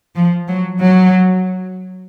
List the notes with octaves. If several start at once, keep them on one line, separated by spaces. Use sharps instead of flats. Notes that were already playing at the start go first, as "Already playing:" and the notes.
F3
F#3
F#3